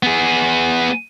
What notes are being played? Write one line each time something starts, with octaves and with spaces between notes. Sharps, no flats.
B3 G#4